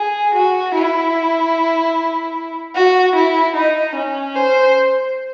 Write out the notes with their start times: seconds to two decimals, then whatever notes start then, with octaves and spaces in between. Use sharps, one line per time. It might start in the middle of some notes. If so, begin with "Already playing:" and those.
Already playing: G#4
0.34 F#4
0.74 E4
2.75 F#4
3.15 E4
3.55 D#4
3.96 C#4
4.35 C5